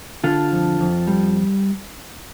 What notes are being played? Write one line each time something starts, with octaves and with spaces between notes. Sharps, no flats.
D3 F4 A4
F2
F2
G3